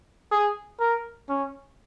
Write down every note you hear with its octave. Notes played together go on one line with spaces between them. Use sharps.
G#4
A#4
C#4